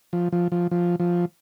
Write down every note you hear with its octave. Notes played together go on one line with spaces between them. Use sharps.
F3
F3
F3
F3
F3